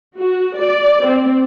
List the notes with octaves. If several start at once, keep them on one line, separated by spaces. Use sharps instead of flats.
F#4
D5
C4